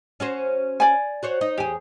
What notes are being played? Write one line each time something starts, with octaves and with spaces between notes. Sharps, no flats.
C#4 F#4 C5
D5 G#5
F#4 C5 C#5
D#4
E2 G4 G#4